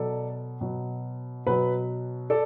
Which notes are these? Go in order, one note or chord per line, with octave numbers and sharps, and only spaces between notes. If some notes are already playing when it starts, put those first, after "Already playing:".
Already playing: B2 F#3 A4 D5
B2 F#3
B2 F#3 B4
A4 D5